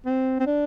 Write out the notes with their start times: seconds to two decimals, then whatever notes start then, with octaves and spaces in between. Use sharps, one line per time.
0.06 C4
0.40 C4
0.46 D4